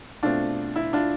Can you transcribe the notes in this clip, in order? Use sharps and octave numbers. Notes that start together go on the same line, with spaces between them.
B2 A3 C4 D4 F4
E4
D4 F4